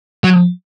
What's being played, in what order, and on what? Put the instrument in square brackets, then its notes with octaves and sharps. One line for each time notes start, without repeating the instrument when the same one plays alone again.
[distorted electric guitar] F#3